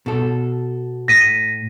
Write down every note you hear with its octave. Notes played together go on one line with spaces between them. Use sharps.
B2 A4
A2 A#6 B6 D#7